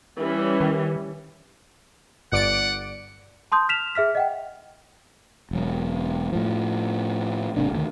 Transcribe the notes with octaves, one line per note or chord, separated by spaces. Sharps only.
E3 G3 C#4
D#3
G1 D5 F#5 D7
A5 C6 D#6 G6
F6 B6 E7 F7
G#4 E5 F6 B6
D#5 F#5 G5
E1 F#3
A2 F3
G#1 C3 A#3 D4
D2 D#3